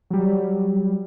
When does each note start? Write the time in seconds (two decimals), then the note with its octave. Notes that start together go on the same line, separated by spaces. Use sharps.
0.10 F#3 G3